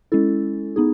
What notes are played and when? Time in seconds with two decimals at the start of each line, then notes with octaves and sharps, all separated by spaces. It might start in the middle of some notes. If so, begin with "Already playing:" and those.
0.12 G#3 C#4 E4 A4
0.76 B3 D#4 G#4